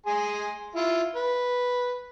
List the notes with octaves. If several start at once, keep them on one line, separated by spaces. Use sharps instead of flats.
G#4 G#5 C6
E4 F4
B4